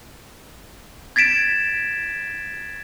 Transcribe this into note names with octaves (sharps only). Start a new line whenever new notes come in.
G#6 A6 B6 D7 E7